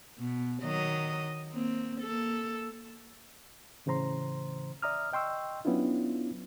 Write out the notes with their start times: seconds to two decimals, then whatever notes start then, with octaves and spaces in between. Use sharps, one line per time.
0.19 B2
0.63 D#3 F#3 D#5
1.52 A#3 C4
2.01 A#3 A4
3.86 A2 C#3 E3 C5 A#5 C6
4.82 D5 E5 A#5 D#6 F6
5.13 D#5 G5 C6 C#6 E6
5.65 F#3 B3 C#4 D4 E4 F4